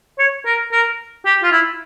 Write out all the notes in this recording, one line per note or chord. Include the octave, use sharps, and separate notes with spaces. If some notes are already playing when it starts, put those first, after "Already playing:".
C#5
A#4
A#4
G4
F4
E4